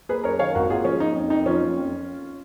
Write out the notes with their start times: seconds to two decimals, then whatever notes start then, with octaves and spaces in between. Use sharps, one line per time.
0.09 A#3 G#4 B4
0.24 F#2 A#4 C#5
0.39 D#3 C#5 F5
0.55 G#1 F#4 A#4
0.70 A#3 F4 G#4
0.85 F3 C#4 F4
1.00 A#3 D#4
1.15 F2
1.30 F2 D#4
1.46 F3 C#4 F4
1.61 A#3
1.77 F2